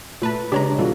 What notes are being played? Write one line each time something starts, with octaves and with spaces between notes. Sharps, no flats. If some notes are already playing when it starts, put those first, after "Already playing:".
A#2 A3 B4 A5
C#3 G#3 D4 G4 C#5 A#5
B2 E3 G3 F4 F#4 A4